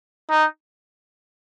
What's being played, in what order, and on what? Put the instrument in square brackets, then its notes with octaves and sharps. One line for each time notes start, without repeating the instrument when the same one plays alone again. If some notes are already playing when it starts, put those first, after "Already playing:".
[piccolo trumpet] D#4